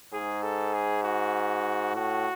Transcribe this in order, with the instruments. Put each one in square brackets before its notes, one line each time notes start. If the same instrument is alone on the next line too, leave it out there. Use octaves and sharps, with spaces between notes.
[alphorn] G#2 [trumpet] G#4
[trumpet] A4
G#4
F#4
[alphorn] A2 [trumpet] F#4